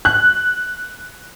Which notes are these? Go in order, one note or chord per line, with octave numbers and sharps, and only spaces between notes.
F#6